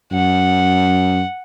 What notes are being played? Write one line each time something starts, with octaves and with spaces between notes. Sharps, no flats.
F#2 F#5